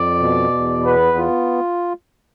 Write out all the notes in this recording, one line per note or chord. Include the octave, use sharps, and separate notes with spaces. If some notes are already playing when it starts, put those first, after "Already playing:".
Already playing: F2 D5
B2
E2
B3 B4
F4